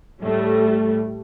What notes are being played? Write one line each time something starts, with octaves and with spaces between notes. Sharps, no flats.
A2 G3 A3